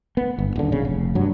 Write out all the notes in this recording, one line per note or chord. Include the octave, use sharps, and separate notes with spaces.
B3
G1
D#1 D3
B1 C#3
F1
G2 F#3